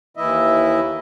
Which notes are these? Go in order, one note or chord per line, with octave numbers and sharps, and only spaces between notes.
D#2 E3 E4 D#5 E5